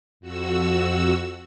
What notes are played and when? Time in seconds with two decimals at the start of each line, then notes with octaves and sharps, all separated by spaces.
0.20 F2 F#4 E6